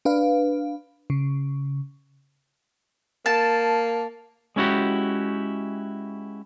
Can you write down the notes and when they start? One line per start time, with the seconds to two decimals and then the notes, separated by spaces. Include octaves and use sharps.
0.05 D4 B4 F5
1.10 C#3
3.26 A#3 A5
4.56 G#3 C#4 E4 F#4 G4